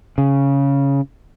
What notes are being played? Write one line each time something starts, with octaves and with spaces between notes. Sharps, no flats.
C#3